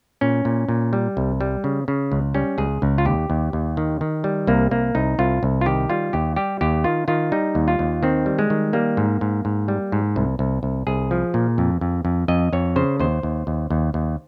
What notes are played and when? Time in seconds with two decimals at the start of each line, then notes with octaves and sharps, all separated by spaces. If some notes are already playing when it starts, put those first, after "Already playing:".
0.21 A#2 C#4
0.45 A#2
0.68 A#2
0.93 G3
1.17 C2
1.41 G3
1.64 C#3
1.88 C#3
2.12 C#2
2.34 G3 C#4
2.58 C#2 G#4
2.82 C#2
2.98 F4
3.05 D#2 G4
3.30 D#2
3.53 D#2
3.77 D#3
4.01 D#3
4.24 G3
4.47 C2 A#3
4.71 C2 A#3
4.95 C2 D#4
5.19 C2 F4
5.43 C2
5.61 F4
5.66 D#3 G4
5.90 G3 F4
6.13 D#2 G4
6.36 G3 G4
6.61 D#2 G4
6.84 D#3 F4
7.08 D#3 F4
7.32 G3 D#4
7.55 D#2
7.68 F4
7.79 D#2
8.03 D#3 C4
8.26 G3
8.39 G#3
8.50 D#3
8.73 G3 A#3
8.97 G#2
9.21 G#2
9.45 G#2
9.68 G3
9.92 G#2
10.16 C2
10.39 C2
10.63 C2
10.87 C2 G#4
11.11 F3
11.34 A#2
11.58 F2
11.81 F2
12.05 F2
12.28 F2 D#5
12.53 F2 C#5
12.76 C#3 C5
13.00 D#2 C5
13.23 D#2
13.47 D#2
13.70 D#2
13.94 D#2